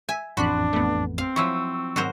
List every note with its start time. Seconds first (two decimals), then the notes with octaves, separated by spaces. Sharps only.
0.09 E5 G#5
0.37 A1 F2 D4 F#4 B5 C6 F#6
0.73 A3 B3
1.18 C4 F5
1.36 F3 F#3 E4 C#6 E6
1.96 G#2 D#3 F#3 F#4 A#4 C5